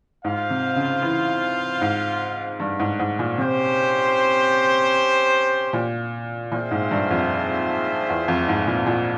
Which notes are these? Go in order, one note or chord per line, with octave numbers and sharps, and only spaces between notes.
G#2 F4 C5 F5
C3
C#3
E3
G#2
G2
G#2
G#2
A#2
C3 C#4 G4 C5
A#2
A#2 C4 F4 G#4 C5 E5
G#2
G2
F2
E2
F2
G#2
A#2
A#2